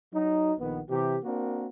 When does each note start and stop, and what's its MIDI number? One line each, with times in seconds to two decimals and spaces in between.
0.14 0.54 54
0.14 0.54 63
0.60 0.80 34
0.60 0.80 51
0.60 0.80 59
0.90 1.18 48
0.90 1.18 52
0.90 1.18 67
1.24 1.67 58
1.24 1.67 60
1.24 1.67 62
1.24 1.67 66
1.24 1.67 70